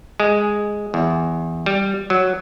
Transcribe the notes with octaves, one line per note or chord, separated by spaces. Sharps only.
G#3
E2
G3
F#3